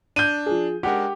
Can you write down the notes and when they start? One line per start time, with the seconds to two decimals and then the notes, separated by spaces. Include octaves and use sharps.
0.16 D4 G6 D#7
0.46 F3 G#4
0.83 G#3 D4 G4 A#4 F#5